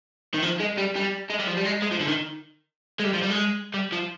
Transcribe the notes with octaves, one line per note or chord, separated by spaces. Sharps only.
D#3
F3
G#3
G3
G3
G#3
G3
F3
G3
G#3
G#3
F3
D3
D#3
G#3
G3
F3
G3
G#3
G3
F3